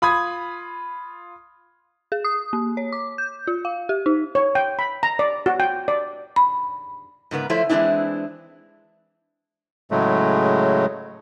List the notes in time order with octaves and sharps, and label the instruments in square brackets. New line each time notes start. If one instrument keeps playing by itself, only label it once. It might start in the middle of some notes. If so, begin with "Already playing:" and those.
[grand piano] F4 B5 D#6 G#6
[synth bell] G#4
D#6
A#3
C#5
D6
G6
F4
F5
G4
D#4
[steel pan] C#5
G5
B5
A#5
D5
F#4
G5
D5
[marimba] B5
[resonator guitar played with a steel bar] G#2 C#3 B3 A#4
F3 A3 E4 C5 C#5
E3 G#3 B3 C4 D4 E4
[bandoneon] A2 C#3 F#3 G#3 A3